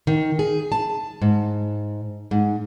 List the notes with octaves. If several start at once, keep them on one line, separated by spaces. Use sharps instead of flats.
D#3
G#4
A5
G#2
G#2